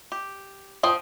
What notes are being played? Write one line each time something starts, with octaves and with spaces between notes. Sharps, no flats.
G4
F3 C5 G5 D#6